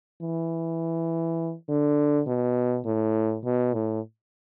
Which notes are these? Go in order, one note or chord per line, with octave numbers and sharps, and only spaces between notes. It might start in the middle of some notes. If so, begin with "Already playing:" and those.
E3
D3
B2
A2
B2
A2